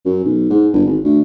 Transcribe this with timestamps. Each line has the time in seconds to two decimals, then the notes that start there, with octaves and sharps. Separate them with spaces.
0.05 F#2
0.24 B1
0.50 G#2
0.73 G1
0.85 G#1
1.04 D2